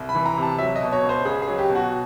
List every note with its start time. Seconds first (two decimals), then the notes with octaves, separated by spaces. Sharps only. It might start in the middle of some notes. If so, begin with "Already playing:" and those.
Already playing: C2
0.09 B5
0.15 E3
0.26 A#5
0.37 C3
0.42 A5
0.58 F#3 E5
0.76 D#5
0.81 B2
0.92 C#5
1.03 C#2
1.09 C5
1.25 C#2 G#4
1.42 G#4
1.48 F#3
1.58 G4
1.70 B2
1.75 F#4